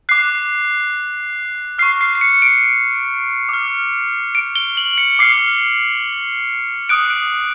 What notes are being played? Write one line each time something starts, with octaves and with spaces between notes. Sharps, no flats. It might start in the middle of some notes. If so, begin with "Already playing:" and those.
D6 F#6 C7
C#6 F6 C7
C7
C7
C#7
D7
D6 F6
D7
G7
F#7
C#7
D6 F6 C7
D#6 F#6 D7